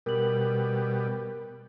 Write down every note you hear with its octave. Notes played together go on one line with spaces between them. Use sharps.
B2 G3 A#4 F#7